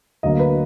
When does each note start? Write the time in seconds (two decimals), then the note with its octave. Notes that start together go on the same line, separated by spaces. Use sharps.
0.23 D2 D3 F#3 A#3 D#5
0.39 B4